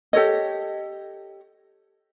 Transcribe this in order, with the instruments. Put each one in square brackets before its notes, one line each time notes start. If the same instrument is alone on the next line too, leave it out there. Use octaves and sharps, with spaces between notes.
[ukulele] G4 A4 C#5 D#5